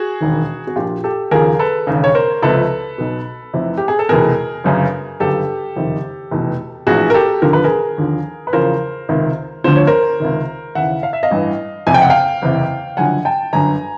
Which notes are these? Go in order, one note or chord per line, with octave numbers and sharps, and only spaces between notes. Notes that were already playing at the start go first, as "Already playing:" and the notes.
Already playing: F#4 G#4
E1 D#2 D#3
F#4
A#1 A#2 F3 F4 G4
G4 A4
D#2 C#3 F3 G#4 A#4
A4 B4
E1 D#2 C#3
C#5
A#4 C5
C#2 C3 F3 A4 B4
B1 B2
F1 F2 C3 E3
G4
G#4
A4
F1 E2 B2 G#4 A#4
G1 F#2 C#3
G1 F#2 C#3 G4 A4
F#1 F2 C3 D#3
F1 E2 B2
A#1 A2 E3 F#4 G#4
A#4
G4 A4
E1 D#2 D3 F3 A#4
B4
G#4 A#4
D#2 D3 F3
B4
E2 C#3 F3 A#4 C5
C#2 C3 D#3
D2 D3 F3 C5
C#5
A#4 C5
C#2 C3 D#3
D#2 C#3 E3 E5 F#5
F5
E5
D#5 F5
A1 G2 E3
F#1 F2 C3 G#5
G5
F#5
F5 G5
F#1 E2 C3
F#1 F#2 D3 F3 F#5 G#5
G5 A5
G1 F#2 D3 G#5 A#5